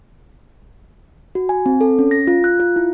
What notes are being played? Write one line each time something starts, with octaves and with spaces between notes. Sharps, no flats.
F#4
G#5
C4
A4
C#4
A#6
F4
F#6
F4
E4